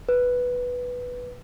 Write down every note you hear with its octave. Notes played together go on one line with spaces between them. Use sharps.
B4